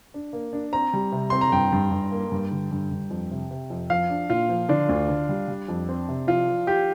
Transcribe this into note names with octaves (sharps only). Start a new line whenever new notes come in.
D4
A#3
D4
C4 A#5
G3
C3
C4 C6
A#5
G2 G5
G2
G2
A#3
G2
D3
G2
G2
F2
C3
C3
F2
F3 F5
D4
A#2 F4
F3
D3 D4
D2
D3
G3
G3
F2
C4
C3
F3 F4
F3
F4 G4